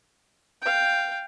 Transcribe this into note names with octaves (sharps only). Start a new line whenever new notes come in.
F5 G5